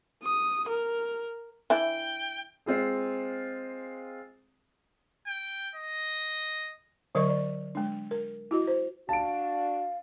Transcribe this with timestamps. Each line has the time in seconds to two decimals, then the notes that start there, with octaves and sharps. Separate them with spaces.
0.23 D#6
0.69 A#4
1.70 E3 D4 E4 G5
2.66 G#3 C4 F4 G#4
5.28 G5
5.75 D#5
7.15 D3 F#3 A#4 D5 D#5 C#6
7.30 D5
7.75 G#3 D4
8.11 A#4
8.51 E4 F#4 D#5
8.67 C5
9.09 D4 F#4 F5 A5 D7